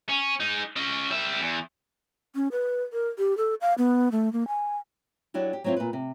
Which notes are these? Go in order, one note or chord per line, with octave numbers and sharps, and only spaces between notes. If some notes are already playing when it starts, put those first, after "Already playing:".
C#4
G#3 D#4
C#4 D#5
G3 E5
E2
C#4
B4
A#4
G4
A4
F5
B3
A3
A#3
G#5
F#3 D4 E4 F#4 G4
G4
F#3 B3 C4 E4 F4
A#2 B4
C3